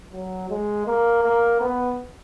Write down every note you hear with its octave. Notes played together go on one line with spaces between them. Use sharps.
F#3
G#3
A#3
A#3
B3